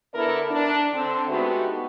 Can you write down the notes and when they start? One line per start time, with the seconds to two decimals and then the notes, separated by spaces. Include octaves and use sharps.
0.14 D3 B3 E4 A4 A#4 D5
0.51 D4
0.94 D3 C4
1.28 G#3 A3 B3 D#4 F#4 G4